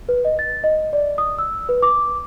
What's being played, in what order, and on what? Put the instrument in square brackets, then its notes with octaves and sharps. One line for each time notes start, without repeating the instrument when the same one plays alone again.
[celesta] B4
D#5
A6
D#5
D5
D#6
E6
B4
D6